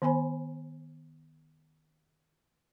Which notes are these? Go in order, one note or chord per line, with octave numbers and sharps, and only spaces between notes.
D#3 B3 C5 G#5 B5